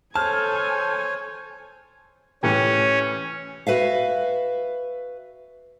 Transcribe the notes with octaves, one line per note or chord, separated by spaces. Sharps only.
A4 C5 C#5 G#5 A5 F6
A2 E3 C#4 G4
F#4 B4 E5 F5